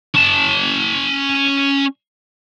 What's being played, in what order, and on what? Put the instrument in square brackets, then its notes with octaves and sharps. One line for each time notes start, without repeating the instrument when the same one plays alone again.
[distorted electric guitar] C#4 A5